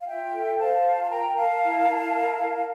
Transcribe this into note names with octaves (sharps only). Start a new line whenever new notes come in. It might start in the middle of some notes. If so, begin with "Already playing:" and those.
F5
F4 E5 G5
A4
C5 F5 A5
F4
A5
A#4 G5 A#5
A#4 F5 A5
E4
E4
A#4
A#4